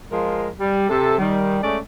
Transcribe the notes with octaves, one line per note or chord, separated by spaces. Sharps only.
F3 G#3 F4 A#4
G3
C3 A4
D#3 G3
G#3 A3 C#4 A4 D5